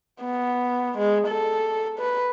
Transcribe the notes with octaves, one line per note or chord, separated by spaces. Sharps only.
B3
G#3
A4
B4